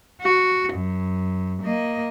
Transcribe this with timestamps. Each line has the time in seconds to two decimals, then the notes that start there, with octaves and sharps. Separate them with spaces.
0.22 F#4
0.74 F#2
1.63 A#3 D#5